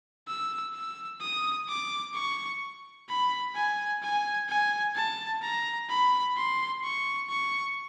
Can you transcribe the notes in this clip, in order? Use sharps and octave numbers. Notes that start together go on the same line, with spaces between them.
E6
E6
D#6
D6
C#6
B5
G#5
G#5
G#5
A5
A#5
B5
C6
C#6
C#6